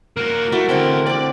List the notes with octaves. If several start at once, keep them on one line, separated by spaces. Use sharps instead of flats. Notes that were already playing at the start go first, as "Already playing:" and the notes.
A#3 F#4 A#4
A3 E4 F#4 D5
D3 A3 C4 A4 C6
D3 C4 D5